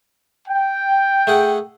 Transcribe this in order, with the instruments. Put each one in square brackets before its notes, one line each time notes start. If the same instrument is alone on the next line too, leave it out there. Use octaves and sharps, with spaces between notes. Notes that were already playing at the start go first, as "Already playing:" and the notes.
[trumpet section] G5
[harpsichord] A3 G#4 F#5